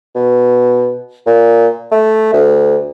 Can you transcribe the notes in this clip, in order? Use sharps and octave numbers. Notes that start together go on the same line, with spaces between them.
B2
A#2
A3
D2